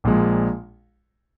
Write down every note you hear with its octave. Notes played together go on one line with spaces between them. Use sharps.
A#1 A#2 F3 G#3